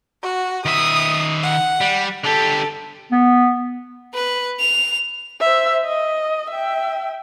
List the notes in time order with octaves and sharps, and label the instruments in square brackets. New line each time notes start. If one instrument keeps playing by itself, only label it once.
[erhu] F#4
[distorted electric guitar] D#3 E5 [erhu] D#6
[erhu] F#5
[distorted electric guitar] G3
[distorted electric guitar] D3 G4 [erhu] A4
[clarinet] B3
[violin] B4
F7
[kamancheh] C5 E5
D#5
E5 G5